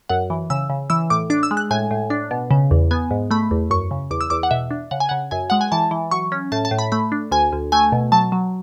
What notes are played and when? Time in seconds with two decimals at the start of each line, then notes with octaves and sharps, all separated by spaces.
0.09 F#2 F#5
0.30 E3
0.50 C#3 E6
0.70 C#3
0.90 E3 E6
1.10 A2 D6
1.30 D4 D6
1.43 E6
1.51 G#3
1.57 F#6
1.71 A2 G#5
1.91 A2
2.10 D4
2.31 B2
2.51 C#3
2.71 E2
2.91 B3 G#5
3.11 G#2
3.31 A3 B5
3.51 E2
3.71 F#2 C#6
3.91 C#3
4.11 E2 D6
4.21 E6
4.30 E2 D6
4.43 F#5
4.51 B2 E5
4.71 D4
4.91 C#3 F#5
5.00 G#5
5.09 C#3 F#5
5.31 F#2 G#5
5.50 G#3 F#5
5.61 G#5
5.72 E3 A5
5.91 E3
6.11 F#3 C#6
6.32 C#4
6.52 A2 A5
6.65 A5
6.71 A2
6.79 B5
6.92 A3 B5
7.12 D4
7.31 D2 G#5
7.53 D2
7.72 A3 G#5
7.92 B2
8.12 F#3 A5
8.32 F#3